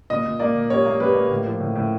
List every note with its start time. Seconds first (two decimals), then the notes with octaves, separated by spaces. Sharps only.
0.10 A#2 D#5
0.24 A#2
0.39 A#3 D5
0.54 A#2
0.70 G3 C#5
0.86 A#3
1.00 G3 B4
1.15 A#3
1.30 A2
1.45 F3
1.60 A2
1.75 A2